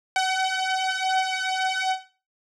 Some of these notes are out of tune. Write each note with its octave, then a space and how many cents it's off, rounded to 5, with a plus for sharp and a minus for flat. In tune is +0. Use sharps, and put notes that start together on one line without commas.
F#5 +35